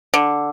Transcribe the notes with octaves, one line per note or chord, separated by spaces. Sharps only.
D3